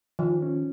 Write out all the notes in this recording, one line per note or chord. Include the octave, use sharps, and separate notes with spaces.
D#3 F3
C#4